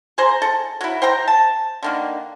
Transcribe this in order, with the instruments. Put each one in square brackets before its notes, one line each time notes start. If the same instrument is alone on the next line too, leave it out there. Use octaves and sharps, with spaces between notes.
[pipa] G#4 C5 A#5
A4
F#3 E4
C5 G5 A#5
A5
D3 D#3 A#3